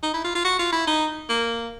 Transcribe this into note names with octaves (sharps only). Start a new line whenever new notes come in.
D#4
E4
F4
F4
F#4
F4
E4
D#4
A#3